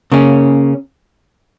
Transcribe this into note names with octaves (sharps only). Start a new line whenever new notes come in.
C#3 A#3 C#4